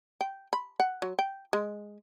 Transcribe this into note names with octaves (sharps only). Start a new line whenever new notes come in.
G5
B5
F#5
F#3
G5
G#3